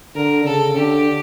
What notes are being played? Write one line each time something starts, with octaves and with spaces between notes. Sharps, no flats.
D3 A#4
C#3 A4
D3 G4